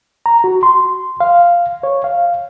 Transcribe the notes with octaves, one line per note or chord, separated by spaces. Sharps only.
A#5
F#4
C6
F5
C#5
F5